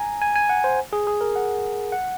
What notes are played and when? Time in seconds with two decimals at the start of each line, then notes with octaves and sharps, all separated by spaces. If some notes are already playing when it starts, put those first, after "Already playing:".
Already playing: G#5 A#5
0.22 G#5
0.36 G#5
0.49 F#5
0.64 C5
0.93 G#4
1.07 G#4
1.21 A#4
1.36 F#5
1.92 F#5